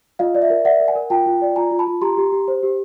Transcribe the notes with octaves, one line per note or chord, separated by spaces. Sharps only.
F4 D#5 F5
D5
E5
A#4
D5 E5 F#5
A#4
F#5 G#5
A#4
F4 G5 A5
F4
D5
F4 G#5 A#5
F4
A5 B5
F4
G4 A#5 C6
G4
G4
C5
G4